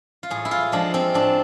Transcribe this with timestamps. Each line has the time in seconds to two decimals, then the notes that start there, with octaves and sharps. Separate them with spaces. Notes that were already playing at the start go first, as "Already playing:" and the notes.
0.23 F4
0.30 A2 G#4
0.45 E4
0.51 F4
0.72 F3 G#3 D4
0.94 C4
1.14 A2 D4